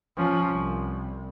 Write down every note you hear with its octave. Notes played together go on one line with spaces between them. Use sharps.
F3 C#4
C2